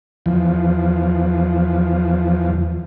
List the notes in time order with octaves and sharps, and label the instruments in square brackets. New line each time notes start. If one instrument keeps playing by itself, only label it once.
[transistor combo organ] E2 F3